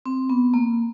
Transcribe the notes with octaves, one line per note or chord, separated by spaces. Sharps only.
C4
B3
A#3